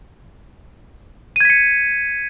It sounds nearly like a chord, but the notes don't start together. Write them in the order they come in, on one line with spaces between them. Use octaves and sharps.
D#7 G#6 B6 C#7